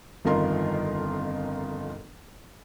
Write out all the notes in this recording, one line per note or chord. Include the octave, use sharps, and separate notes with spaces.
G1 F2 D#3 F4 A#4 C6